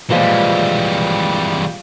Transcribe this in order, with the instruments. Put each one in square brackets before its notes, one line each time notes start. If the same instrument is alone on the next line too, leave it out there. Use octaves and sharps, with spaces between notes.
[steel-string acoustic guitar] A#2 F3 G#3 [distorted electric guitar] E3 G3 [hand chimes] F4 F5 B6